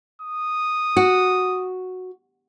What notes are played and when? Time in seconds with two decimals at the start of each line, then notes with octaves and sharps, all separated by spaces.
0.22 D#6
0.97 F#4